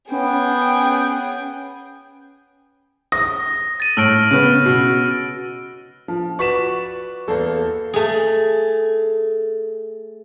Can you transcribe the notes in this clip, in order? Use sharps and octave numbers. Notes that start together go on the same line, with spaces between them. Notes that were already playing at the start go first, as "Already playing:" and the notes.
B3 C#4 G#4 G5
D#6 A#6
A6 D#7
A2 E6 F6 D7
C#3 B3
B2
F3
F#4 B4 D5 C#6 B6 E7
E2 A#3 A4
A3 G#4